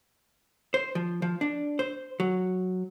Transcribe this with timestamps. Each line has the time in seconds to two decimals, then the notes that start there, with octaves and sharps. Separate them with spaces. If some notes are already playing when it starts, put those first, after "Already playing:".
0.74 C5
0.95 F3
1.22 F3
1.41 D4
1.79 C5
2.20 F#3